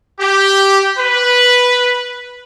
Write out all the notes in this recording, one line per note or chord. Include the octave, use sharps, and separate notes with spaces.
G4
B4